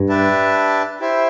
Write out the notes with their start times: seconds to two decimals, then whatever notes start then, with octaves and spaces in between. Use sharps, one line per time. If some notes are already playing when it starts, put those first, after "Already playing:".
Already playing: G2
0.09 D4 G4 B4 E5 A5
1.00 E4 G4 C5 E5